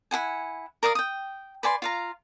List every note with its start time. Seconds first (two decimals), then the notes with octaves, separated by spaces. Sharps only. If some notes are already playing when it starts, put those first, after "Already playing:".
0.11 E4 G#4 F#5 G#5
0.83 A#4 D5 F5 D#6
0.95 G5 D#6
1.63 B4 D5 G#5 C6
1.82 F4 F5 A#5